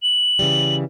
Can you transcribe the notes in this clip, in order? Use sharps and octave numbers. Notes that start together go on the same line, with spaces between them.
F#7
C#3 E3 G3